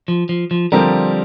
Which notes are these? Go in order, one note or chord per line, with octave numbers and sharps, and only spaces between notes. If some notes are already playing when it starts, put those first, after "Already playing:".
F3
F3
F3
D3 F3 G3 C4 G4 A#4